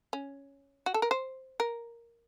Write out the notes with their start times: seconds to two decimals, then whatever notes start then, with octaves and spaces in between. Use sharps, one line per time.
0.13 C#4
0.86 F#4
0.94 A4
1.02 A#4
1.11 C5
1.60 A#4